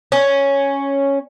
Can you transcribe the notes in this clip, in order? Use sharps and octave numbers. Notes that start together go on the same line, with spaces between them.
C#4